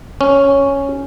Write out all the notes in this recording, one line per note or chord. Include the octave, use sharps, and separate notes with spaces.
C#4